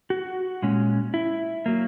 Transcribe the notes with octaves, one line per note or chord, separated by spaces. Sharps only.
F#4
A#2 G#3 C#4
E4
F#3 A#3